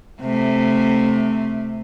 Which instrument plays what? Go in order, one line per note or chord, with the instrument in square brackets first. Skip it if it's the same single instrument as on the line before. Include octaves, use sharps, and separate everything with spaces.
[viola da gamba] C3 A3